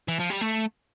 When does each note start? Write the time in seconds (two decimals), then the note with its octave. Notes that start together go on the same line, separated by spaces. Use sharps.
0.08 E3
0.19 F3
0.30 G3
0.41 A3